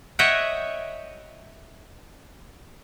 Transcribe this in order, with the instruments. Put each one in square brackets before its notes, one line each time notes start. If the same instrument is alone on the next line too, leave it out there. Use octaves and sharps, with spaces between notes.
[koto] C#5 D#5 E5 F#5 G5